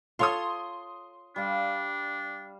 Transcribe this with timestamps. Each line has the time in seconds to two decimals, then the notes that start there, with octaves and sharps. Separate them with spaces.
0.19 F4 A4 C#5 C6 D#6
1.36 G3 D4 F5